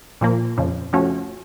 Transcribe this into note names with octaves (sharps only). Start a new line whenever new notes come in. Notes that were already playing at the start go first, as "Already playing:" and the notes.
A#2 F3 A#3
F2 C#3 F3
F3 A3 C#4 F#4